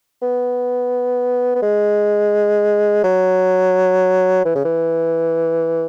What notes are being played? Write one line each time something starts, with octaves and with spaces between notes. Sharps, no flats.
B3
B3
G#3
F#3
E3
C#3
E3